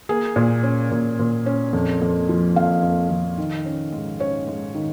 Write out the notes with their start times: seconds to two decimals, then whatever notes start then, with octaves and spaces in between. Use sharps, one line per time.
0.09 A#3 G#4
0.36 A#2
0.63 C#4
0.91 A#2
1.19 A#2
1.46 C#4
1.73 F2
2.02 F2
2.29 F3
2.56 F2 F5
2.83 F2
3.10 F2
3.38 D#3
3.66 C#4
3.93 G#2
4.20 C#4 C#5
4.47 G#2
4.74 D#3